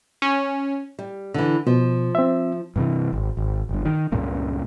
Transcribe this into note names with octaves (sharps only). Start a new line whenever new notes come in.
C#4
G3
D3 E3
B2 F3
C4 E5
G2 C3 E3
G#1
G#1
G1 G2
D#3
C#2 G2 A#2 C#3